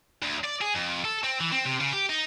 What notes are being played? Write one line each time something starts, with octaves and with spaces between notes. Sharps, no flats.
D2
D5
G#4
F2
A4
C4
E3
C4
C3
C#3
G4
D#4